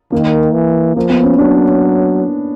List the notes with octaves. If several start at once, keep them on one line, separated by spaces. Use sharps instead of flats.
D#3 A#3
E3
F3 A#3
B3
C#4
F#3 D4